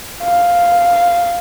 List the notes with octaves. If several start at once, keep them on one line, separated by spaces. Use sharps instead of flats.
F5